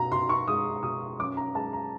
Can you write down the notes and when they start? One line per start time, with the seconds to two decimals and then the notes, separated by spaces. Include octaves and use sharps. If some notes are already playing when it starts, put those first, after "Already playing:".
Already playing: B2 A#5
0.12 B2 C6
0.29 C#6
0.48 G#3 D#6
0.83 B2 D#6
1.19 F#2 D6
1.37 A#5
1.55 G#3 A5
1.73 A#5